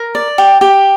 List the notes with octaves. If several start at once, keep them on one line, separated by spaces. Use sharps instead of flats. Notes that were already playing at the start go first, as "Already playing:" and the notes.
Already playing: A#4
D5
G4
G4